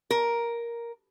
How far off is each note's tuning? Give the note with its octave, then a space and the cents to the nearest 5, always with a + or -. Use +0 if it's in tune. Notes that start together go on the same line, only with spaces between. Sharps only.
A#4 +5